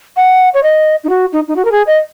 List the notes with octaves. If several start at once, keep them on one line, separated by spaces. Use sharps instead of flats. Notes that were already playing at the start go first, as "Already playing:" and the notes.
F#5
C#5
D#5
D#4
F#4
D#4
D#4
F#4
A#4
G#4
D#5